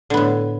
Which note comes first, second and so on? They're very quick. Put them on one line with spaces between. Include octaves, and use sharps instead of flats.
D3 B3 A2